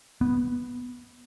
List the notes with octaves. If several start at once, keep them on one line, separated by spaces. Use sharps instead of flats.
B3